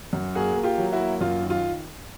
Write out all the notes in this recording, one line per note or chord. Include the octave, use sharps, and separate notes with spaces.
F#2
A#3 F#4 G#4
A#3
F4 G4
F#3
E4 F#4
A#3
F#2 F4
D#3
F4